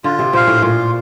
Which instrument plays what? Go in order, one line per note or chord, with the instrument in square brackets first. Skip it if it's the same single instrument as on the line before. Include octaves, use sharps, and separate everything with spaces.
[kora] D3 [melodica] F4
[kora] C3
[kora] A#2 [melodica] C5 F5
[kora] A2
[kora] A#2 [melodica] F4